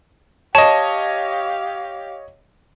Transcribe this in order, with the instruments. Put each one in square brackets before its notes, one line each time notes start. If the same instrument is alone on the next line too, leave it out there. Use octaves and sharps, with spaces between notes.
[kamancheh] G4 F5 [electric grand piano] C#5 D#5 [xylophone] A5